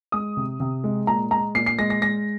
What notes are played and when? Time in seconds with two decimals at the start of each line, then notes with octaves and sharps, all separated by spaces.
0.12 G#3 D#6
0.37 C3
0.60 C3
0.84 G#3
1.07 A#2 A#5
1.31 G#3 A#5
1.55 A#2 C7
1.66 C7
1.79 G#3 A#6
1.90 A#6
2.02 G#3 A#6